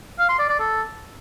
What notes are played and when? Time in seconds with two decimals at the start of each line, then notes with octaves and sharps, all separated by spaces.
0.19 F5
0.29 C6
0.39 D5
0.49 D5
0.60 A4